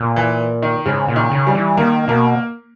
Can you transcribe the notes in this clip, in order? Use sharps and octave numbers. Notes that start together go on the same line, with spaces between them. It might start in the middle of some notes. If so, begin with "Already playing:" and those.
Already playing: A#2
E3
D#3
G#2 C#3
A#2
D#3
C#3
G3
E3
D#3 A#3
B2 A#3